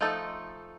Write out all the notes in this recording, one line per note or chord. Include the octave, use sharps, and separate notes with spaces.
F3 A3 D#4 A4